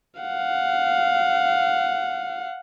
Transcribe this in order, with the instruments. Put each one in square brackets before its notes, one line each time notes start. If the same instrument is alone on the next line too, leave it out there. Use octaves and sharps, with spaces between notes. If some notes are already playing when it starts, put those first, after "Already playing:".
[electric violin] F5 F#5